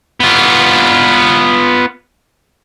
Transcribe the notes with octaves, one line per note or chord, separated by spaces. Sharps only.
B3 F4